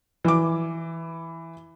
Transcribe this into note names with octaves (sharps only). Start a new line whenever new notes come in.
E3 D6